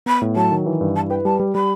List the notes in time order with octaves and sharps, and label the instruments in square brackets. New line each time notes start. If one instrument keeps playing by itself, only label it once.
[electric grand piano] B3 [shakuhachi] B5
[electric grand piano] A2
[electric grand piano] F#3 [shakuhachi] A5
[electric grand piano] D#3
E3
G2
[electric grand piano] E4 [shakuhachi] A5
[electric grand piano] B4 [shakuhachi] G5
[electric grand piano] G3 [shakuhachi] A5
[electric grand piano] G3
[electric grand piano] G3 [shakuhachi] B5